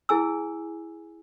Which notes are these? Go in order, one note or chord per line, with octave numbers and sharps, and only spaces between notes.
E4 G#4 G#5 E6